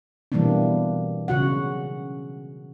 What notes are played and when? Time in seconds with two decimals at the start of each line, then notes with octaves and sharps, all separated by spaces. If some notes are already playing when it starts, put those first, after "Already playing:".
0.32 B2 E3 G3 A#3 C4 D4
1.28 C#3 F#4 F#5